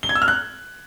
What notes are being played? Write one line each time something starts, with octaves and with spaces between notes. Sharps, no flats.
G7
G#6
E6
F6
F#6